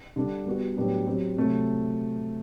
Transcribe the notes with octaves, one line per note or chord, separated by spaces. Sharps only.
D3 G3 D4
G3 B3 F#4
A2 F#3 B3 D4 G4
F#3 C4 G4
C3 F#3 A3